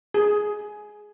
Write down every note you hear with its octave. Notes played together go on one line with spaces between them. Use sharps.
G#4